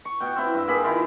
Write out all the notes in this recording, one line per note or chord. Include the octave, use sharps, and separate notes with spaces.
C#6
B2 G5
C4 E4
G2
A#3 G#4 B5
D#3 E4 F4